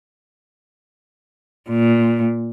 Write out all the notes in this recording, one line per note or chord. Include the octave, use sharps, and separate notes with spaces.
A#2